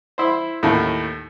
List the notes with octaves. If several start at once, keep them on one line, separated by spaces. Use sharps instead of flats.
E4 C5
D#2 A2